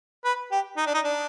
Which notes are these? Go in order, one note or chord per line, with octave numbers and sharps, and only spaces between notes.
B4
G4
D#4
D4
D#4
D4